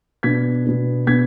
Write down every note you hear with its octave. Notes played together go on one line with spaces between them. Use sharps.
B2 B3 D4 G#6 B6
B2 B3 D4
B2 B3 D4 G#6 B6